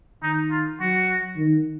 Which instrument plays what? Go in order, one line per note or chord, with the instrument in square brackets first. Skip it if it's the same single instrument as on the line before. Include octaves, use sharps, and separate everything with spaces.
[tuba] D#3 [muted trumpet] D#4
[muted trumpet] F4
[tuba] F#3 [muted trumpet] F#4
[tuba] D#3